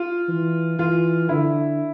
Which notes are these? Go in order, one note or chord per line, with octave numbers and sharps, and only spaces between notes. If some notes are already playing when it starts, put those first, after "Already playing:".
Already playing: F4
E3
E3 F4
D3 E4